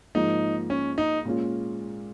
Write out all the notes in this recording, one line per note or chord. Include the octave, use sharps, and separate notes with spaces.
G#2 F3 A#3 D#4
C#4
D#4
A#2 G#3 C#4 F4